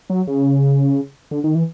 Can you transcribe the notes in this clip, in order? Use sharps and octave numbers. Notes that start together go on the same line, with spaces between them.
F#3
C#3
D3
D#3
E3